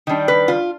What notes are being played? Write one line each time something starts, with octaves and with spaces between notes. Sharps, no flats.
D#3 G3 D4
B4
F4